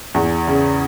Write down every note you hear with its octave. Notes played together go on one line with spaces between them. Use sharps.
E2
C#3